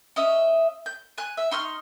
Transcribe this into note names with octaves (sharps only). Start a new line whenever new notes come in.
C#4 D#5 E5
G6
G#5 F#6
E5
D#4 C6 C#6 F6